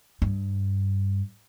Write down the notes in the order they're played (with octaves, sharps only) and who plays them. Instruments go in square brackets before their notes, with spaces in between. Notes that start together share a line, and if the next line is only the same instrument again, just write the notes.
[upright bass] G2